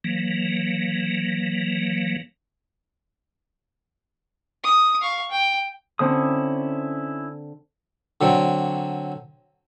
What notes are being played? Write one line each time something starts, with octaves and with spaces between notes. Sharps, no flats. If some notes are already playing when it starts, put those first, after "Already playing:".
E3 F#3 A#3
D#6
F5 C#6
G5
D3 C4 C#4 E4 D#6
D3 F#3 C4